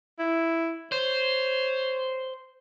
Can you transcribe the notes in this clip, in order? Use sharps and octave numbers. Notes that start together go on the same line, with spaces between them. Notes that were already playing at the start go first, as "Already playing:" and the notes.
E4
C5 C#5